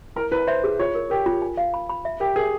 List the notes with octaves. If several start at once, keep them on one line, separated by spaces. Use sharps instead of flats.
E4 A#4
E4 B4
C5 E5
G#4
F4 C#5
A#4
G4 A#4
F4
G#5
F5
B5
B5
E5
G4 A#4
G#4 A#4